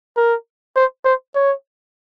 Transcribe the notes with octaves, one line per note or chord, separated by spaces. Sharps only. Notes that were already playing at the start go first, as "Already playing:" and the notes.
A#4
C5
C5
C#5